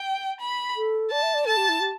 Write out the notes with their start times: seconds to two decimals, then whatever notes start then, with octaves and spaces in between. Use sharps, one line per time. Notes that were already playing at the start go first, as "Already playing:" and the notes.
Already playing: G5
0.41 B5
0.77 A4
1.11 D5 A5
1.23 E5
1.34 D5
1.46 A4 A5
1.57 G4
1.69 E4
1.80 G4